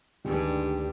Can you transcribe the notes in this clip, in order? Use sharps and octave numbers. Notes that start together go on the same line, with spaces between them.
D2 G2 D#3 G#3 G4